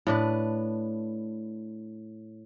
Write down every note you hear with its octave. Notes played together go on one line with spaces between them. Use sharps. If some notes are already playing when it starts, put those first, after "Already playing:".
A2 D4 B4